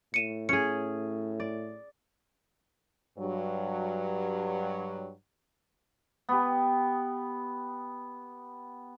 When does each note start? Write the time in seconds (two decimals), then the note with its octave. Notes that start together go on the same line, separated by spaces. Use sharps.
0.14 A2 C#7 D#7 E7
0.49 C#4 G#4 C#7
1.40 D5
3.19 G2 F#3
6.29 B3 G4